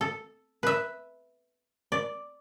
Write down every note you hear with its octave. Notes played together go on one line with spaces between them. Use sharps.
A4
B4 E5
D5